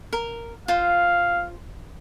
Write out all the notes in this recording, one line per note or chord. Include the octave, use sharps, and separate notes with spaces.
A#4
F4 C5 F5